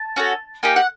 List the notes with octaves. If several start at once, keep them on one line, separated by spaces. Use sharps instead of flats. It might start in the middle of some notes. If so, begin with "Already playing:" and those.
Already playing: A5
C#4 F#4 A4
A#3 D#4 G4 G#5
F#5